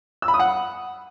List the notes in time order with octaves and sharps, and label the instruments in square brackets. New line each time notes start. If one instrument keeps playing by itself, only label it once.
[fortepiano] E6
B5
D#6
F#5